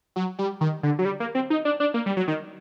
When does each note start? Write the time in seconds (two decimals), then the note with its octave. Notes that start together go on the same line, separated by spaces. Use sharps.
0.16 F#3
0.39 G3
0.61 D#3
0.83 D3
0.99 F#3
1.05 G3
1.20 A#3
1.35 C4
1.50 D#4
1.65 D4
1.80 D4
1.94 A#3
2.06 G3
2.17 F#3
2.28 D#3